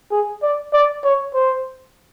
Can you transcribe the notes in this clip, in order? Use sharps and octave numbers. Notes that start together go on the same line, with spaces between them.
G#4
D5
D5
C#5
C5